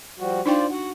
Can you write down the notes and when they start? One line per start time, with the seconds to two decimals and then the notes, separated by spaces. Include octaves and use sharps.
0.19 F3 G3 F#4
0.46 D4 D#4 F4 C5 D5 G5
0.71 F#4 F#5